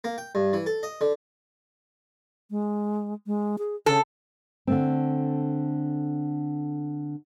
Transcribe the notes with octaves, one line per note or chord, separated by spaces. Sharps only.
A#3
G5
G2
E3
A4
D#5
D3
G#3
G#3
G#4
C#3 A4
D3 A3 C4